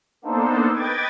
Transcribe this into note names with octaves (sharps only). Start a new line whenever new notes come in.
A#3 B3 D4 D#4 A4 C5
B4 D#5 G5 D6 G#6 A6